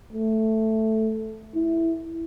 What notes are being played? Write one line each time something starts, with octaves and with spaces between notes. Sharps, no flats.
A3
E4